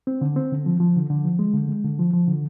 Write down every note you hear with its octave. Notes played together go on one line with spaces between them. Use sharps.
C4
D3
C4
D3
F3
F3
D3
D3
F3
G#3
D3
G#3
D3
F3
F3
D3